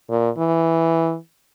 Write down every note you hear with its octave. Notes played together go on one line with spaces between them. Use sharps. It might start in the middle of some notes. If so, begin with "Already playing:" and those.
A#2
E3